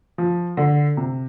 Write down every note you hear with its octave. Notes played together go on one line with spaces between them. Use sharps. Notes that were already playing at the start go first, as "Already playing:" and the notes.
F3
D3
C3